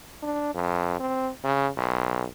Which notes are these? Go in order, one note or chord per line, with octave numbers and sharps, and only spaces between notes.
D4
F2
C4
C#3
B1